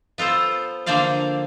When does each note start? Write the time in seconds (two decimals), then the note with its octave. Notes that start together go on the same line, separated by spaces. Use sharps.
0.18 B3 F4 A4 C5
0.86 D3 F3 A#3 C5 D5 F5